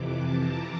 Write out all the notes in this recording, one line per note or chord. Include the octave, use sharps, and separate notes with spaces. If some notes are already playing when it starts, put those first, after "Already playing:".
Already playing: F2 C3 E3 D6
A5
A#5